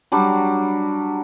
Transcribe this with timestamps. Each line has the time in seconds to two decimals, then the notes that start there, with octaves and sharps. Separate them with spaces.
0.12 F#3 G3 D4